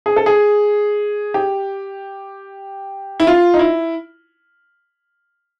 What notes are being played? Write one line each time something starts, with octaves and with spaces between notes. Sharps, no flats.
G#4
A4
G#4
G4
E4
F4
D#4
E4